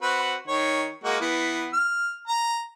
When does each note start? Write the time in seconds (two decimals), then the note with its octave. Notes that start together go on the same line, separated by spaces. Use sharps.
0.02 C4 F#4 B4
0.48 D#3 C#5
1.04 G#3 A#3 F#4
1.20 E3 B3
1.73 F6
2.27 A#5